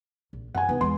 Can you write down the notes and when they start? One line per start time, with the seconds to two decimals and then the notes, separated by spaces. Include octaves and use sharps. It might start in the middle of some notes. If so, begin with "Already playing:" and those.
0.33 A#1
0.55 F#2 F#5 G#5
0.69 C2 B3 D#4
0.81 E2 G#3 C6